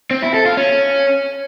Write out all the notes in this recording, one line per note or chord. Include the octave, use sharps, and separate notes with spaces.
C4
E4
A4
F4
C#4